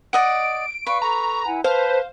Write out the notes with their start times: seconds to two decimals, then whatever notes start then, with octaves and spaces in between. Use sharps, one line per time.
0.13 D5 D#5 F#5 D7
0.87 B4 D5 F5 C#6
1.02 A4 A#5 C#6
1.46 E4 F#5 G#5
1.64 B4 C5 F5 A5